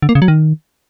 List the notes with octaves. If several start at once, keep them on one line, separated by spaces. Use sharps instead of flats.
D3
A#3
C#3
F#3
D#3